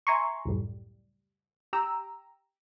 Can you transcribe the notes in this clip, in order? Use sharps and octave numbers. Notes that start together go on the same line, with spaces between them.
E5 G#5 A#5 C6 C#6
C#2 F#2 A2 G3
G4 G5 A#5 E6